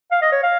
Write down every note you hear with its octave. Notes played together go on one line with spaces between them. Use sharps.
F5
D#5
C#5
F5